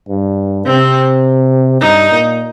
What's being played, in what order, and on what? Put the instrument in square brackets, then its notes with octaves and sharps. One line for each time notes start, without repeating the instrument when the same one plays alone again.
[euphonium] G2
[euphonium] C3 [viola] C4
[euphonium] G2 [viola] D#4
[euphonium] A#2